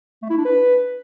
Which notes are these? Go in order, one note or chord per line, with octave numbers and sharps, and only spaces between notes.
A3
E4
D4
B4